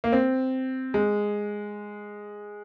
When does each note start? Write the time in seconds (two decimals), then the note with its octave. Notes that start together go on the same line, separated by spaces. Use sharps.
0.04 A#3
0.12 C4
0.94 G#3